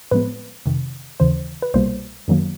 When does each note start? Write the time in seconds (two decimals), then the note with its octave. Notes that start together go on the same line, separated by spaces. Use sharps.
0.11 A2 F3 G#3 B3 B4
0.66 F2 C3 D#3
1.20 D#2 C#3 E3 C5
1.62 B4
1.74 C2 B2 G3 A#3 C5
2.28 F#2 D#3 F#3 A#3